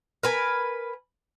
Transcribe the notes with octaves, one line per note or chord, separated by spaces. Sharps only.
A#4 B4 G#5